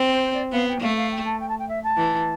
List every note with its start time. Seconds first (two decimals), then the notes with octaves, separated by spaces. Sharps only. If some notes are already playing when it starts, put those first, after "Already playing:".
Already playing: C4
0.09 C5
0.23 C5
0.33 D5
0.52 B3 F5
0.67 G5
0.81 A3 F5
0.96 F5
1.11 G5
1.25 A5
1.40 G5
1.48 A5
1.58 G5
1.68 E5
1.83 A5
1.97 E3